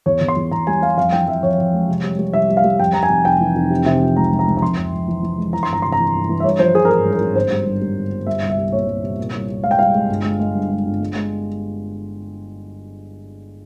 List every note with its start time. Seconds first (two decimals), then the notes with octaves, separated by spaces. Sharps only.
0.06 E2 C#5
0.21 E2
0.28 C6
0.36 E2
0.51 E2 A#5
0.67 G3 G#5
0.82 G3 F5
0.97 F2 F5
1.13 E3 G5
1.28 F2 E5
1.43 F2 C#5
1.58 F2
1.73 G#3
1.88 C3
2.04 G3
2.19 G3
2.33 C2 E5
2.50 G3
2.57 F5
2.64 G3
2.80 F2 G5
2.93 F2 A#5
3.03 G#5
3.10 F1
3.25 F1 G5
3.40 E3
3.55 F1
3.70 C3
3.86 C3
4.01 F3
4.16 C#2 A#5
4.31 C#2
4.39 A#5
4.47 C#2
4.57 A#5
4.62 F2 C6
4.77 F1
4.93 F2
5.08 E3
5.23 E3
5.38 G#3
5.53 E3 A#5
5.63 C6
5.68 G1 A#5
5.82 C3 C6
5.92 A#5
5.99 E3
6.14 G1
6.29 E3
6.40 E5
6.44 G2 C#5
6.59 F3 C5
6.74 F3 G#4
6.85 A#4
6.90 G#1 G#4
7.05 G2
7.13 A#4
7.21 G#1
7.35 G1 C5
7.51 G3
7.66 G2
7.82 G3
7.96 G1
8.11 G1
8.27 G3 E5
8.42 C2
8.50 E5
8.58 C2
8.72 A#2 C#5
8.87 C2
9.03 C2
9.18 A#2
9.33 C2
9.48 C2
9.63 G#3 F5
9.71 G5
9.78 C2 F5
9.95 G#3
10.09 G1
10.25 G#3
10.40 G#3
10.55 G2
10.70 G#3
10.85 G1
11.00 G#3
11.15 G#3